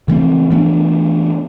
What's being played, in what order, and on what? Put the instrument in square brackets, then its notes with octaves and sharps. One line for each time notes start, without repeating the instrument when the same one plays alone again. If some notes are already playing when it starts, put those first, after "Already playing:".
[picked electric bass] C#3 E3 A3 C4
E3 A3 B3 D4